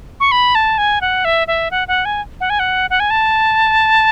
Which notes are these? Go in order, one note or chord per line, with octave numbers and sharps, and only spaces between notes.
C#6
B5
A5
G#5
F#5
E5
E5
F#5
F#5
G#5
F#5
G#5
F#5
F#5
G#5
A5